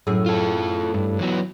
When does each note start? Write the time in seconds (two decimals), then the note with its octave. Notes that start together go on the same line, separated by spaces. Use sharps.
0.07 F#2 A2 G#4
0.26 F4 A4
0.94 G2
1.19 E3 F#3 B3